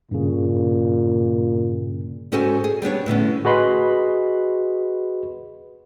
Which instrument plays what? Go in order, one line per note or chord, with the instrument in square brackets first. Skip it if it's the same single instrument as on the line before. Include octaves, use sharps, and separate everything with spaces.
[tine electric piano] G2 C#3 [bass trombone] A#2
[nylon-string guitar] G#2 C#4 F#4 A4 C5 G#5
G#4
G3 B3 D4 C#5
A2 D3 B3 C#4
[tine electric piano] F#4 G#4 B4 D#5 B5 C6